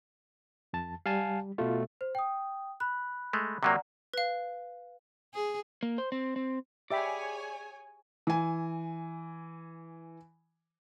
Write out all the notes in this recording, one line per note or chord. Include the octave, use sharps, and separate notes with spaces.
F2 A5
G3 F5 G#5 A5
B2 A3 F4
C5
G5 D#6
B5 F#6
G#3 A3
C3 F#3 A#3 D5 F#5 A#5
B4 F5
G#4
A#3
C5
C4
C4
G4 G#4 C#5 D5 E5 G5 G#5 B5
E3 G#5